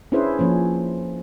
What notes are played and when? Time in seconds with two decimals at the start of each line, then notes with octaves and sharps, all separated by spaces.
0.12 C#4 D4 E4 G#4 B4 C5
0.39 F3 A#3 C#4